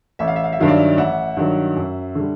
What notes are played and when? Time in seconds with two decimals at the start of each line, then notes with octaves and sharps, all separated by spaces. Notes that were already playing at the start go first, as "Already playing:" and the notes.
0.19 A1 E5
0.28 F5
0.36 E5
0.44 F5
0.52 E5
0.59 G2 D#3 F#3 F5
0.68 D5 E5
0.98 A1 E5 F#5
1.37 G2 D#3 F#3
1.76 F#2
2.15 D3 G3